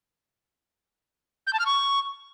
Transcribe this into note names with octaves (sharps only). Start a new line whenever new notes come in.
G6
A5
F6
C#6